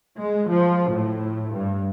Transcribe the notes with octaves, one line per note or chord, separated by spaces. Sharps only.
G#3
F3
A2
G2